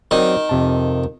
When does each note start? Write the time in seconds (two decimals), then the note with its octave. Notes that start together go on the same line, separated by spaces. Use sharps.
0.11 D#3 F#3 C4 D5
0.49 F2 C3 A5